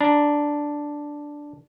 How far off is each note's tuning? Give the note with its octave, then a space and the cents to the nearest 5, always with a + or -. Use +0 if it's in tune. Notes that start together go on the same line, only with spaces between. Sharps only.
D4 +0 A#5 +15